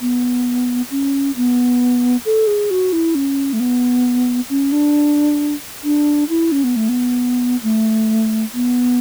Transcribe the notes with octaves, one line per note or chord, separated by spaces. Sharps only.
B3
C#4
B3
A4
G#4
F#4
E4
C#4
A3
B3
C#4
D4
D4
E4
C#4
B3
A3
B3
A3
B3